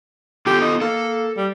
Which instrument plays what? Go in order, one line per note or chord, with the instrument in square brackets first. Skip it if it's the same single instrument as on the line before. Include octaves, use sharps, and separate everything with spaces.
[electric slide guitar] B3 F4 A4 [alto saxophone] G4
[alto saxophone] D#4
[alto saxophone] A#3 [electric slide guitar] A4
[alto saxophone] G3